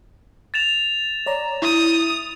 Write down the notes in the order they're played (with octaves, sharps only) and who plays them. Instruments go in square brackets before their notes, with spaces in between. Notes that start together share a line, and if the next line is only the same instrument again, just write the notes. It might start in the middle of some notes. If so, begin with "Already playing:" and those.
[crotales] A6 E7 F7
[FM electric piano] C#5 D5 A#5
[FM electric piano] E4 [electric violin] D#6